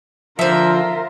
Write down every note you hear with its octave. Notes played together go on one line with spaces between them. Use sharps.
D3 F3 F4 A#4 C5 E5